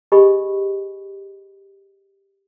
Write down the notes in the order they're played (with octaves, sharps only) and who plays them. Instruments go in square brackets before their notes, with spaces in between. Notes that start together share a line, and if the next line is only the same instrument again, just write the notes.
[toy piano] G4 G#4 D#5 G#5 B5 C#6